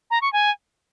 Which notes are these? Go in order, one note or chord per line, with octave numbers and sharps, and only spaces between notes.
A#5
C#6
G#5